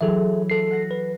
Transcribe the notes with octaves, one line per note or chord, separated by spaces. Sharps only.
E3 F#3 G#4 A4 E5
A4 C7
F#5 A#6
B4